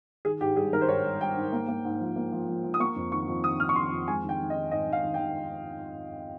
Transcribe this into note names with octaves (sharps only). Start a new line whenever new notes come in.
D#3 G#4
G#2 G4
G3 G#4
D#3 A#4
C5
G#2 C#5
G3
G3 G5
G#2
A#3
A#3
G#2
F3
A#3
F3
F3
F3
D#6
A#3 C#6
F2
D#3 C#6
F2
D#3 D#6
F2 F6
C#6
D#3 C6
F2
G#3 G#5
D#3 G5
D#3
D#5
D#3
G#2 D#5
D#3
F5
D#3
G5
D#3